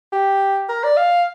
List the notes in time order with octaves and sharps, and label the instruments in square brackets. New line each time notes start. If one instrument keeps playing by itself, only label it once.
[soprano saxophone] G4
A#4
D5
F5